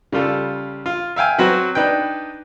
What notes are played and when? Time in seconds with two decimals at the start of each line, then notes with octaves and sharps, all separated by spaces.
0.12 C#3 G3 F4 A4
0.86 F4
1.16 E5 F5 G5 G#5
1.38 F#3 C4 F#4 B4
1.75 D4 D#4 B4 G5